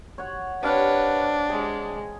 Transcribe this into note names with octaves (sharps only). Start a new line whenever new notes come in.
C#5 F#5
C3 D4 B4 C#5 F5 F#5
G#3 G#4